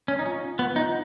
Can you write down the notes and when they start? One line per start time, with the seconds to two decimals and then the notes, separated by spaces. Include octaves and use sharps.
0.08 C#4
0.19 D#4
0.26 C#4 F4
0.59 B3
0.76 D#4